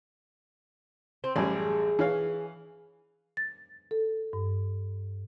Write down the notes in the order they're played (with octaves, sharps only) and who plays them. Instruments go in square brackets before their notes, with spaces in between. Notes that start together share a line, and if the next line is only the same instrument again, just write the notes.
[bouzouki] C4
[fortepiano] A1 F#2 G3 [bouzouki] G#4
[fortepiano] E3 C#5 F5
[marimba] A6
A4
G2